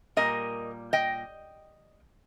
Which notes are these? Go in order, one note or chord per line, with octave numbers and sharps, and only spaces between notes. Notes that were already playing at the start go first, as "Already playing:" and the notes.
A#2 G3 A#4 D#5
D#5 G5